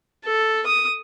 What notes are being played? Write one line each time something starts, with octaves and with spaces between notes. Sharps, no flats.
A4
D#6